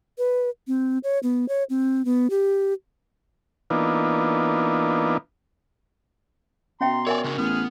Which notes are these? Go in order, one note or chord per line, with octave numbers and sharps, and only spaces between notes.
B4
C4
C#5
B3
C#5
C4
B3
G4
E3 A#3 B3 D4 D#4 F4
B2 C#4 E5 G5 A#5 C6
F4 A#4 C#5 D5 E5 G#5
C#3 D4 F#4
A1 B3 G#4 F6